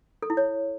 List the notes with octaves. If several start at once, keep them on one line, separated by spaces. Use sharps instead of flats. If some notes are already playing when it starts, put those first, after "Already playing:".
A4
E4
C#5